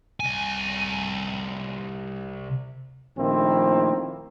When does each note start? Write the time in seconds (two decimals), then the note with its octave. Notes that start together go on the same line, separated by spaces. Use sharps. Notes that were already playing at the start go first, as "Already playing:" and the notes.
0.20 C2 G#5
3.18 A#1 D#3 A3 A#3 C4 E4